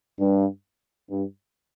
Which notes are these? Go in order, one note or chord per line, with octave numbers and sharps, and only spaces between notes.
G2
G2